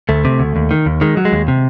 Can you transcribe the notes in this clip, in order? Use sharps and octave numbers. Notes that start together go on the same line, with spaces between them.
D2 A3
C3
D2
D#2
D#3
D#2
D#3 G#3
F#3
G#3
D#2
C3